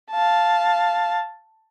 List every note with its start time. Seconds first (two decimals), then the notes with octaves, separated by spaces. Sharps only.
0.11 F5 A5